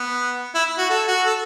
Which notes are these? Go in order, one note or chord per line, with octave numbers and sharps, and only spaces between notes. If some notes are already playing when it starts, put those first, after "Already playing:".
Already playing: B3
E4
F#4
A4
F#4
A4